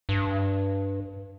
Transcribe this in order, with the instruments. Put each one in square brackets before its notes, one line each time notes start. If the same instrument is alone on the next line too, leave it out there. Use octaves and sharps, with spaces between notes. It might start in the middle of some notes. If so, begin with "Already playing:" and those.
[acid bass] G2